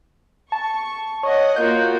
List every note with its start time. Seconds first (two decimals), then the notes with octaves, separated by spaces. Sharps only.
0.52 A5 C#6
1.23 C#5 D#5 F#5
1.56 A#3 F4 F#4 G6